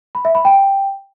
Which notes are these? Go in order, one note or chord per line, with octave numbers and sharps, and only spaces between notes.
B5
E5
B5
G5